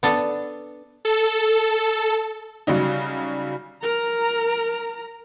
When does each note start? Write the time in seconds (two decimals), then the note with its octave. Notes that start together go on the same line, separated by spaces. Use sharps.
0.03 B3 D4 A4
1.05 A4
2.67 C#3 F#3 G3 D#4
3.83 A#4 A#5